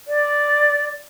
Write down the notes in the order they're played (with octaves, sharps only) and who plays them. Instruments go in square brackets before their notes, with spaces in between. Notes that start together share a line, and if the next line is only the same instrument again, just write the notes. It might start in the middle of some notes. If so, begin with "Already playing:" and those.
[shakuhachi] D5